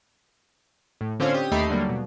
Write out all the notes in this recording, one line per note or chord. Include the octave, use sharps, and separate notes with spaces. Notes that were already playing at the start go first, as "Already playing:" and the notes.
A2
D3 C4 C#4 F4 C5 G#6
G4 D#6
D#2 A3 D#4 G4 B5 C7
D3 F#3 G3 A#3
B2